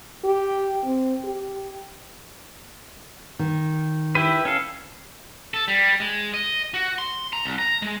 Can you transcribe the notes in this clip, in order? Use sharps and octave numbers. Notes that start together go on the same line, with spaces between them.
G4
C4
G4
D#3
E4 G4 B4
C#4 A4 F5
A4
G3
G#3
D#5
F#4
C6
A#5
C2
A#5
G#3